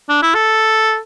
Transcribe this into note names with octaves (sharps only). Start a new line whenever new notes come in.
D4
E4
A4